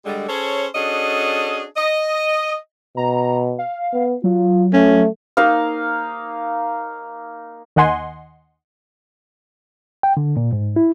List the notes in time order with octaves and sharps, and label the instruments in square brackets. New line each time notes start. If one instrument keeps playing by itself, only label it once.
[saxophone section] D3 G3 G#3
C#4 G#4 A4 C5 C#5
C#4 D4 F#4 G#4 A4 D#5
D#5
[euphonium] B2 [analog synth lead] A#5
[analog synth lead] F5
[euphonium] B3
[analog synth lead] F#3 [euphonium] F4
[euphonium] A3 [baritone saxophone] C#4
[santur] A#3 D#4 F5
[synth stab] D#2 D#3 D#5 F#5 G#5 C6
[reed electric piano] G5
D3
A#2
G#2
E4